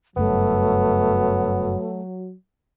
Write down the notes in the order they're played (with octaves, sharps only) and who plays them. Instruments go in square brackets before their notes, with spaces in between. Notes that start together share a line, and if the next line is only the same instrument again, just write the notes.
[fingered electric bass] F#1 G2 [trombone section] F#3 [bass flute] A3 [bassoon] B3